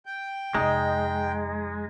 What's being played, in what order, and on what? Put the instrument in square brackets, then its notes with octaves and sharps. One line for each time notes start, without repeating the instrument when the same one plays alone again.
[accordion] G5
[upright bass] F2 C3 [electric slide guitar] G#3 [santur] D#4